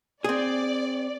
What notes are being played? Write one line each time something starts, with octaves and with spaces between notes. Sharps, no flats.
C4 G#4 D5